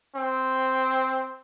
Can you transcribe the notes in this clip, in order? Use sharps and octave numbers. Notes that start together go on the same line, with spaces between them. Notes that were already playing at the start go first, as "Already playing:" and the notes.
C4